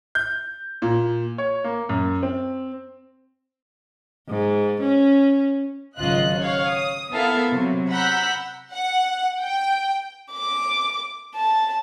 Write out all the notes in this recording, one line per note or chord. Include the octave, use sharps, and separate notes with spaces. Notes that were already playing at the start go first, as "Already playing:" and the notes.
G6
A#2
C#5
A#3
F#2
C4
G#2
C#4
G#1 C#3 F#3 F4 D#5 F#6
C#5 F5 F#5
D#6
B3 E4 A4 A#4 E5 F5
C3 F#3
F#5 A#5 B5 E6 F#6 G6
F#5
G5
D6
A5